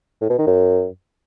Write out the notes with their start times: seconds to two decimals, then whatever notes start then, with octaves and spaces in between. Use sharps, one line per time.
0.21 A2
0.30 B2
0.38 D#3
0.47 F#2